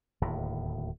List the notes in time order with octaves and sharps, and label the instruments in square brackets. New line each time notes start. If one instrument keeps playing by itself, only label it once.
[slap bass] D1 D#2 A2